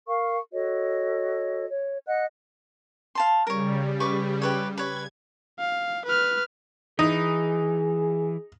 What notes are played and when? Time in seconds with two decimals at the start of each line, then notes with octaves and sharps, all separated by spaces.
0.08 A#4 F5 C#6
0.53 F#4 A4 C#5 D#5
1.69 C#5
2.07 D#5 F#5 F#6
3.15 F5 A5 C6
3.47 C#3 G3 A#4 C#5
4.00 B4 C#6 D6
4.42 G4 B4 C#5
4.78 B4 C#5 G#6
5.59 F5
6.05 B4 F6
6.99 E3 D#4 G#4